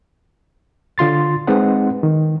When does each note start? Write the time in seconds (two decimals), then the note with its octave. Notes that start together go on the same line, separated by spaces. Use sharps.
0.98 D3 F4 C6 A6
1.47 G#3 C4 D#4 B4 F#5
2.03 D#3